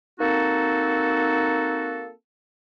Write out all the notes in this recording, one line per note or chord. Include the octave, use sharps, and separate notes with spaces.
A#3 C4 D#4 F#4 A4